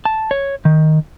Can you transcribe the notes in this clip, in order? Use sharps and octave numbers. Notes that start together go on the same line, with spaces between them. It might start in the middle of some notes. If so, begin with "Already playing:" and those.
A5
C#5
D#3